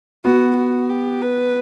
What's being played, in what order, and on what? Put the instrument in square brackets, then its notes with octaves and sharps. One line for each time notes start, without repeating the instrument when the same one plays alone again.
[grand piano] B3 [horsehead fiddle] F#4
[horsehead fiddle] F#4
G4
B4